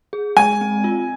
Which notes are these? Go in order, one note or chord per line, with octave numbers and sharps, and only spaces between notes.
G#4
G#3 G#5
C4
F4